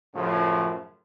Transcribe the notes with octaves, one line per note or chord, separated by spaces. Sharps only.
F#2 A2 C#3 F3